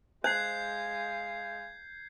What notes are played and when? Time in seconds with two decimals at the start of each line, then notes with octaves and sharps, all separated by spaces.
0.24 G#3 C5 F5 G6 G#6 C7